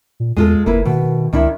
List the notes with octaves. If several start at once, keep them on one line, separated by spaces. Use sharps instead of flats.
A#2
E2 G#3 F4 A4
F#1 A#3 E4 B4
B2 D#3
C#2 D#3 D4 E4